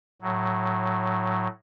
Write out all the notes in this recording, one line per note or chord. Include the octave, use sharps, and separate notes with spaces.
A2 F#3